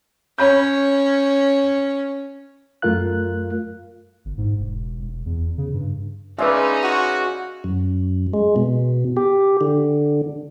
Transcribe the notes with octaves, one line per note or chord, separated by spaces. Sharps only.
C#4 C#5 B5 G6
F#2 A3 F4 A#4 F5 F#6
G1
G#2
E1
E1
E2
C#3
G2
C#3 G#3 C#4 D#4 B4 D5 E5
F#4
F#2
G#3
B2
G4
D3